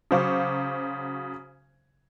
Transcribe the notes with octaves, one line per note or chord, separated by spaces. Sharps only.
C#3 F#3 C5 F5 C#6 D6